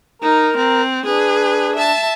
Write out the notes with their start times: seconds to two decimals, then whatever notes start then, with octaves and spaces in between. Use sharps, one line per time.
0.22 D#4 A#4 A#5
0.57 C4
1.05 D4 G#4 B4
1.76 E5 A5